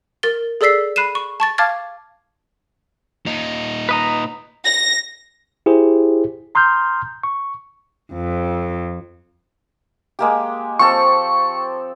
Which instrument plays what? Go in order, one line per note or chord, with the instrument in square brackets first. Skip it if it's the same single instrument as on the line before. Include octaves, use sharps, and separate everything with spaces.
[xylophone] A#4 A6 G7
G#4 A4 D5 E6 B6 C7
B5 F#6 C7 D#7 E7
C#6
A5 C#6 A6
F5 A5 D6 F6 G#6 A6
[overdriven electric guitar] A#2 D#4
[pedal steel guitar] B4 D#5 A#5
[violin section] A#6
[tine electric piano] E4 G4 G#4 C5
A#5 C6 D#6 F6 G6
C#6
[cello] F2
[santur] G#3 A#3 G4
[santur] F3 C4 A4 [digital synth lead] C#6